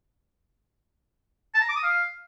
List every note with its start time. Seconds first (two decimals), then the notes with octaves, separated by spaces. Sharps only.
1.54 A5
1.62 A#5
1.69 D6
1.76 D#6
1.83 F5